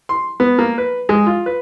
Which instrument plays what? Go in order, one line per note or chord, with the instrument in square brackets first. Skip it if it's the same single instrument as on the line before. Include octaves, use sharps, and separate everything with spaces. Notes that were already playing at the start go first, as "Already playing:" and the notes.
[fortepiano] C6
B3
A#3
B4
G#3
F4
B4